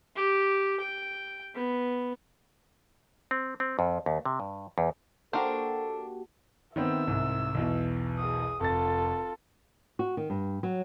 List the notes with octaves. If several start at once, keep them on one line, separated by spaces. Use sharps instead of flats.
G4
G5
B3
C4
C4
F2
D#2
C3
G2
E2
A#3 D4 F#4 G4 A4 A#4 C5
D#3 B3 C4 E5 E6
C2 G#2
B1 E2 B2
G#4 D#6
F1 F4 A4 A6
F#4
D#3
G2
F#3